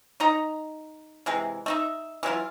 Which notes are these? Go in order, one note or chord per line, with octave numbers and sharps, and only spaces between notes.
D#4 D#5 A#5
C3 E3 G#3
A3 D#4 E5
E3 F#3 E4 F4